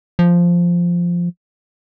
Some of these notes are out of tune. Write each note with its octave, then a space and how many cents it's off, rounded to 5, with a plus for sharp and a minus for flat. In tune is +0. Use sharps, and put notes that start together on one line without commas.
F3 -5